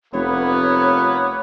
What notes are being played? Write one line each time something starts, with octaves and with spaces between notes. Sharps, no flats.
F1 A#3 B3 C#5